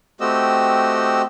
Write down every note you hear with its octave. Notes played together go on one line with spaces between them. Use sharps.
A3 C4 F#4 G4 D#5 E6